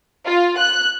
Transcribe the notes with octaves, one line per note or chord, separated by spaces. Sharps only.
F4
F#6